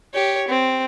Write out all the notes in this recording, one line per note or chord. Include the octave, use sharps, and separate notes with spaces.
G4 C#5
C4